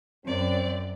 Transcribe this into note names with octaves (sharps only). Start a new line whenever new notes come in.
F#2 C4 D5